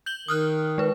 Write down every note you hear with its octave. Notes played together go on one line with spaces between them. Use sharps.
G6 F#7 G7
D#3 D#6 F6 F#6
G#3 B4